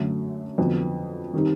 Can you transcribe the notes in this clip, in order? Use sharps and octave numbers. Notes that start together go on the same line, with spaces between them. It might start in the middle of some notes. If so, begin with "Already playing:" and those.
Already playing: F#2 D3 F#3 A3
F2 D3 F#3 B3
D#3 G3 C4 D#4